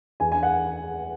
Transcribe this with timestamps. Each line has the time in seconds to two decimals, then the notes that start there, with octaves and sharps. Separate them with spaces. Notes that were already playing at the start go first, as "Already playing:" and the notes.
0.20 E2 G#5
0.32 G#5
0.43 F#5